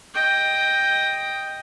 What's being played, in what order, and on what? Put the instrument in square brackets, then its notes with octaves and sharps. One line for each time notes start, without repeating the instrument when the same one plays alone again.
[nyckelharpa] D#5 G5